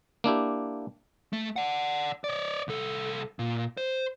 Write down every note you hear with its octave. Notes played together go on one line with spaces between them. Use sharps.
A#3 D4 E4 G4
A3
D5 F#5
C#5 D5
C2 A4
A#2
C5